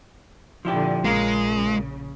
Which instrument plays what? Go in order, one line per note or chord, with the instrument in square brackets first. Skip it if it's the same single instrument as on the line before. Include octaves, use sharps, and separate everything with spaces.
[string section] A#2 D3 [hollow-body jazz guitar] F3 E4 G4
[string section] A#1 C#3 [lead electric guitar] G#3 [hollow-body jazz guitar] A#3 F4